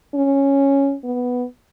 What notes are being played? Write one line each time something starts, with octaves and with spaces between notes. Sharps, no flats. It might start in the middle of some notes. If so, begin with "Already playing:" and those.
C#4
B3